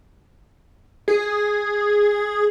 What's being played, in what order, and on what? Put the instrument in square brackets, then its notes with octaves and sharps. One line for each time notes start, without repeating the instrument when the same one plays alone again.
[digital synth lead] G#4